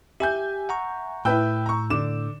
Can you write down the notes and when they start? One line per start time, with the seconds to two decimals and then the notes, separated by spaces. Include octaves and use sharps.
0.20 G4 E5 G#5 G6
0.69 F#5 A#5 C#6
1.25 A2 E4 B4 G5 E6 G6
1.66 A#5 C#6
1.90 D3 D6 E7